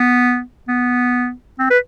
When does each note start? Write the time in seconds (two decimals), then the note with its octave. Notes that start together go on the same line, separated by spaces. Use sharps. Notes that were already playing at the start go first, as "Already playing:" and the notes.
Already playing: B3
0.68 B3
1.59 C4
1.70 B4